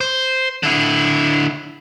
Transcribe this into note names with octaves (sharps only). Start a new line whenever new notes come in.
C5
D3 E4